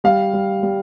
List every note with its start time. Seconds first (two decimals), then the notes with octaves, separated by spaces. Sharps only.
0.04 G3 F5
0.33 G3
0.63 G3